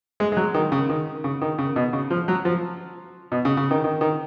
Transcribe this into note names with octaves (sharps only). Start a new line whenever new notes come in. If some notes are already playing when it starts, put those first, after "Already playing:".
G#3
G#3
F#3
D#3
C#3
D#3
C#3
D#3
C#3
B2
C#3
F3
F#3
F3
B2
C#3
C#3
D#3
D#3
D#3